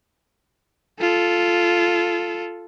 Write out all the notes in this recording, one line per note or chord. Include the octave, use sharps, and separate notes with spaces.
F4 A4